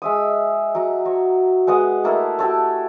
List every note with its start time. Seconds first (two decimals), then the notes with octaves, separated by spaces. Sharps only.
0.02 G#3 E5 D#6
0.75 F#3 A#5
1.05 F#4 C#5
1.67 G#3 B3 D#5 F#5
2.04 A3 A#3 E4 A4
2.39 F#4 G4 A4 C#5